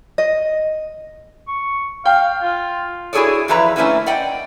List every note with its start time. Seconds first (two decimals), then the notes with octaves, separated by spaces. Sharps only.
0.18 D#5
1.48 C#6
2.06 F5 G5
2.43 F4
3.13 E4 F#4 G#4 A4 C#5 D5
3.48 E2 E3 F3 E4 B4 A#5
3.76 A3 A#3 C#4 D4 E4 B4
4.06 D5 D#5 F#5 G5